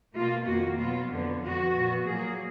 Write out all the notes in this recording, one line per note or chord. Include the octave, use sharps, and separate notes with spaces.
B2 A#3 F4
F2 D#3 A#3 F#4
B2 F#3 B3 F4
F2 D3 F#3 B3
F2 F3 B3 F#4
A#2 F3 B3
A#2 F#3 A#3 G#4